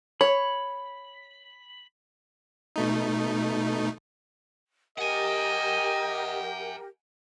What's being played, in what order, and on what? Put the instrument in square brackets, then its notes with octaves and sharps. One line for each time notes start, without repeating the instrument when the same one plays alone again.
[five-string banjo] C#5 [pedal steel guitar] B5
[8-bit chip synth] B2 A3 D#4
[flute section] G4 A#4 [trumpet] D#5 [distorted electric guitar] F#5 G#5